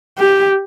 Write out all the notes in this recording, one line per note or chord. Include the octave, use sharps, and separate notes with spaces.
G4